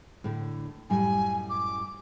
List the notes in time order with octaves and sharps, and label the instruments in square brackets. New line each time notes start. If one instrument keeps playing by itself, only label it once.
[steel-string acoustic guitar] A2 D3
[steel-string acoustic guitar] F#2 A2 G3 [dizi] G#5
[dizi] D6